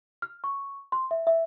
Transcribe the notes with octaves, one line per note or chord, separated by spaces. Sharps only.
F6
C#6
C6
E5
E5